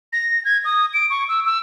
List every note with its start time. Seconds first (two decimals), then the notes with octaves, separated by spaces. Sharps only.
0.13 A#6
0.45 G#6
0.65 D#6
0.94 D7
1.10 C#6
1.29 E6
1.45 E6